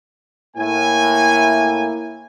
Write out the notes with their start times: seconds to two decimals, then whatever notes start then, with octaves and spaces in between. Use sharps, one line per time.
0.57 A2 A#3 E4 G#5